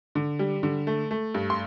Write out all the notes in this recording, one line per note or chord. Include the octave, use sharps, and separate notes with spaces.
D3
G3
D3
A3
A3
G2
C6